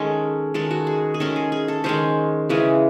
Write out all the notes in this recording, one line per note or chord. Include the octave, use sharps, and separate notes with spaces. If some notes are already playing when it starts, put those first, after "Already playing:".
Already playing: D#3 G#3 C#4 A4
D#3 G#3 C#4 A4
F#4
G#4
G#4
D#3 G#3 C#4 A4
G#4
G#4
A4
D#3 G#3 C#4 C5
C#3 E3 G#3 C#4